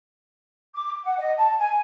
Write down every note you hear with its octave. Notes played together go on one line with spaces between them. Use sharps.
D6
F#5
D#5
A5
G#5